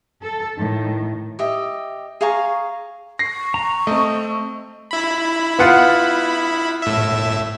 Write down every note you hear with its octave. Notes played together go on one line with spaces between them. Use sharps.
A4
A2 D#3
G4 D#5 E5
G#4 F5 A#5 C#6
C#6 A#6 C7
A#5
A3 C4 D#5
E4 B5
B3 F4 F#5
A2 E5